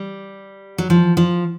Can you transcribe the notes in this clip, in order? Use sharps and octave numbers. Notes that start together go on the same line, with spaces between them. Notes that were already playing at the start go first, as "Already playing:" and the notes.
Already playing: G3
F#3
F3
F3